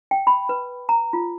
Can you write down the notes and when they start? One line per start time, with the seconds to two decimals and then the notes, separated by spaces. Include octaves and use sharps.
0.11 G5
0.27 B5
0.49 B4
0.89 A#5
1.13 F4